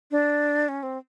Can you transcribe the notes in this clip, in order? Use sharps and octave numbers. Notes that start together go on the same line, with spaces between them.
D4
C#4
C4